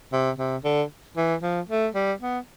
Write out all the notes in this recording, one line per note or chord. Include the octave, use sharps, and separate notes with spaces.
C3
C3
D3
E3
F3
A3
G3
B3